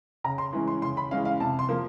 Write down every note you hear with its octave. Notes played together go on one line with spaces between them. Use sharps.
C#3 A#5
C6
E3 G#3 C#4
C6
C#3 C6
B5
E3 G#3 C#4 F5
F5
C3 A5
C6
F3 A#3